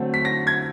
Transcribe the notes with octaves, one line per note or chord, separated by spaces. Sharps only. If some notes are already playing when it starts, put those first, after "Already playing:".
Already playing: D3 F#3 A3 C4
B6
A#6
G#6